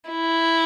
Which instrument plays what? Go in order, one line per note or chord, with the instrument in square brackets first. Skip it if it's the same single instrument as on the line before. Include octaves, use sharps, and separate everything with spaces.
[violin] E4